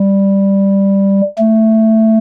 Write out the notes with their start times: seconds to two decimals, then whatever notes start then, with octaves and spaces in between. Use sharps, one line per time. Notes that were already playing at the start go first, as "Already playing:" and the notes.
Already playing: G3
1.39 A3